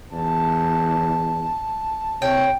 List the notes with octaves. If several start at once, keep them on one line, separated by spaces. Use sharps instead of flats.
E2 A5
C3 C#5 G5